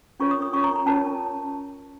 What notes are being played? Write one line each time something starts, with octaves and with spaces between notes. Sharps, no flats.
C#4 F4 A#4 C#5 C#6
D#6
D#6
C#4 F4 A#4 C#5 C#6
A#5
A#5
C#4 F4 A#4 C#5 A5